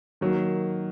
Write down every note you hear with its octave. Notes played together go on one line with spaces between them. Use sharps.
D#3 F#3 A#3